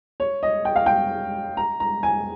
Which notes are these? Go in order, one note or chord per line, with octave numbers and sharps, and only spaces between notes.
C#5
D#5
G5
F5
G5
A#5
A#5
G#5